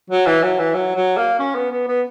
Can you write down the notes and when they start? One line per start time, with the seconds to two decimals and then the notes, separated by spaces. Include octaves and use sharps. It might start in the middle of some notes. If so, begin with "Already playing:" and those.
0.10 F#3
0.26 E3
0.43 F#3
0.59 E3
0.74 F#3
0.96 F#3
1.17 A#3
1.39 C#4
1.55 B3
1.71 B3
1.87 B3